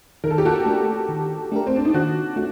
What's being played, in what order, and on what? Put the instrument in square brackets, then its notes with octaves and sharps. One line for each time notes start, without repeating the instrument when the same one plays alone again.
[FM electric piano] D#3 [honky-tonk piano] A#4
[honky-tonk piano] A4
G4
F#4 A4
[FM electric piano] A3 D4 G4 A#4
D#3
A3 D4 G4 A#4
[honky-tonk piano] C4
D4
D#4
[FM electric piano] D#3 [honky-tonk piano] D4 F#4
[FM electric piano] A3 [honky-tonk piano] F#4